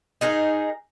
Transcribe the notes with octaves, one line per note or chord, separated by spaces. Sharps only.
D#4 G#4 A#4